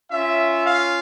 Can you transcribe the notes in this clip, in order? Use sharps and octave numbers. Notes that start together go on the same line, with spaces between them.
C#4 F4 E5
F5